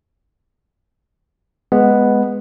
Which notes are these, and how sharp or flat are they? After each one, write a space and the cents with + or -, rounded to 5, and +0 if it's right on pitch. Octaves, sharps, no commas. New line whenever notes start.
G#3 +0 B3 +0